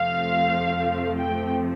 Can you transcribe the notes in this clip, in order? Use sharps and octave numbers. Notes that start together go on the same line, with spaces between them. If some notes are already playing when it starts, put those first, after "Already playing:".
Already playing: F2 C3 F3 A3 C4 F5
G5